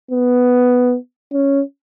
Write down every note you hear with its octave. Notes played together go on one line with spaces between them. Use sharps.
B3
C#4